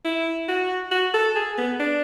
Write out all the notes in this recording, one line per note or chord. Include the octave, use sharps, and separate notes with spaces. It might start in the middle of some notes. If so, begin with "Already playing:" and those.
E4
F#4
F#4
A4
G#4
B3
D4